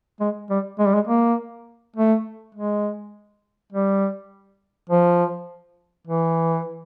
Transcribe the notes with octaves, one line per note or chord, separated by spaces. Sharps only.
G#3
G3
G#3
G3
G#3
A#3
A3
G#3
G3
F3
E3